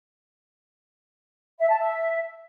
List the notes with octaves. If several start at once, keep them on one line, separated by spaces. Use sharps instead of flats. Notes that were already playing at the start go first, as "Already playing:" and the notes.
E5
A5
E5